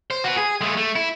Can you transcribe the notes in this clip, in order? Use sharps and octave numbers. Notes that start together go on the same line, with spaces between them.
C5
F#4 B4
G#4
G#3 A3
A3
E4